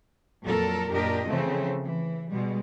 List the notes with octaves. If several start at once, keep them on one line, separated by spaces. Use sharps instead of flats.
F2 A#2 F#3 A4 A#4
F#2 A#2 D4 G4 A#4 D#5
C#3 E3 F3 A3 C4
E3
B2 G3 G#3